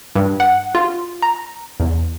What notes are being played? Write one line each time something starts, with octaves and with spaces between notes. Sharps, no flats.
G2
F#5
F4
A#5
E2